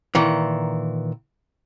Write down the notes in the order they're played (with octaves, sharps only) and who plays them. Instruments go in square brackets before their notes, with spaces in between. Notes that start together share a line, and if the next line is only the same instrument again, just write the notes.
[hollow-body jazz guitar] A#2 D#3 E3